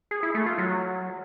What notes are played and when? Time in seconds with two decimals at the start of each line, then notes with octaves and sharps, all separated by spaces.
0.11 G#4
0.23 E4
0.35 A3
0.46 F4
0.58 F#3